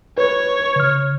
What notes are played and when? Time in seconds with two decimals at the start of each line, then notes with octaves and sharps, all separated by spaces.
0.18 B4 C#5
0.76 C#3 F6